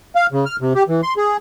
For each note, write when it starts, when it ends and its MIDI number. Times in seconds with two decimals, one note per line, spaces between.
0.15 0.27 77
0.32 0.45 49
0.46 0.56 89
0.61 0.73 48
0.75 0.83 67
0.88 1.01 52
1.03 1.14 84
1.17 1.37 68